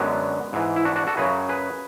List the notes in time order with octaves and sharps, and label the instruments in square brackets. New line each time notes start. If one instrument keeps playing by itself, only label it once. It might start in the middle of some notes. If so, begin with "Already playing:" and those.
Already playing: [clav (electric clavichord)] F#2 D3 F#3 G#3 B3
G#2 E3
E4
D4 F#4
D4 F#4
F#4 A4
F#2 C#3 F#3 G#4 B4
G#4 B4